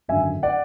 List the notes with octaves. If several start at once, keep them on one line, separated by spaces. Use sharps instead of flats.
G#1 F#2 D3 E5 G#5
D5 F#5